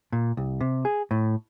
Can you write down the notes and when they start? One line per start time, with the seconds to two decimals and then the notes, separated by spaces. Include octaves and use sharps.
0.12 A#2
0.37 C2
0.61 C3
0.85 G#4
1.11 A2